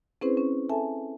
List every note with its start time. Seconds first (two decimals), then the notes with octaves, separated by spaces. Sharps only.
0.21 C4 C#4 E4 G#4 B4 C5
0.37 C#4
0.69 A4 E5 G#5 A5